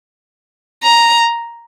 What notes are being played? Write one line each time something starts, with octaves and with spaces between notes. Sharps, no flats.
A#5